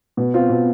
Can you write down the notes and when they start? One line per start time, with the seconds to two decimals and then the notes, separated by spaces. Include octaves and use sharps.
0.17 B2
0.34 C4 F4
0.49 B2